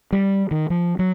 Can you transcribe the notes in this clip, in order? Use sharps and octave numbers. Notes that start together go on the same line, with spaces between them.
G3
D#3
F3
F#3